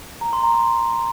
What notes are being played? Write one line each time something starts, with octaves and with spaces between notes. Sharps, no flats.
A#5
C6
A#5
C6